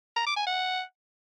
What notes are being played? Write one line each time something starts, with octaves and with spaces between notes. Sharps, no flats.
A#5
D6
G#5
F#5